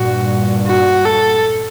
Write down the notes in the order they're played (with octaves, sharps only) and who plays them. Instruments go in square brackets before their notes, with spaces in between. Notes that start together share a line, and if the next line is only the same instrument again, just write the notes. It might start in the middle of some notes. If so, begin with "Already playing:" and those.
Already playing: [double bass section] G2 A#2 [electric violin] F#4
[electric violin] F#4
A4